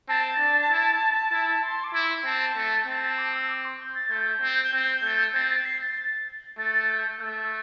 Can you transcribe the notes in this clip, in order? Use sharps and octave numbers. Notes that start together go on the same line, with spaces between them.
C4 A5
D4
E4
E4
C6
D6
E4
C6
C4 A5
A3
C4 A5
A5
D6
E6
D6
C6
G6
A6
A3 G6
C4
C4
A3
C4 A6
A6
C7
A6
A3 A6
G6
A3 E6